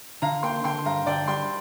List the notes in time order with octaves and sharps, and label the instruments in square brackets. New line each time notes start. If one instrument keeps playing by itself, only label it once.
[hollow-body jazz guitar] D3 [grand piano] F5 A#5
[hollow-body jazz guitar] A#3 [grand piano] G5 C6
[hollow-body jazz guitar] D3 [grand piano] G5 C6
[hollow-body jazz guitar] G2 [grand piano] F5 A#5
[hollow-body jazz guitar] D3 [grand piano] D5 G5
[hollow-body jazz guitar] G3 [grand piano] G5 C6